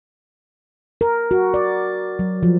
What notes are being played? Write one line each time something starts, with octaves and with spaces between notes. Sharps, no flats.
A#4
F#4
D5
F#3
F3